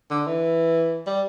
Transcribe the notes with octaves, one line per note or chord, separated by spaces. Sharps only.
D3
E3
G3